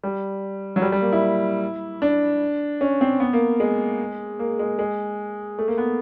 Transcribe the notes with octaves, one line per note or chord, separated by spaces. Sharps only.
G3
F#3
G3
G3
A#3
E4
D4
C#4
C4
B3
A#3
G#3
A#3
G#3
G#3
A3
A#3
B3